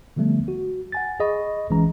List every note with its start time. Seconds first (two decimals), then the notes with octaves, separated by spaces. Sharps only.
0.16 D3 F3 G3 A3 B3
0.48 F#4
0.92 F#5 G#5 A6
1.20 G#4 D#5 B5 C#6
1.70 A1 E3 G#3 C#4 A#5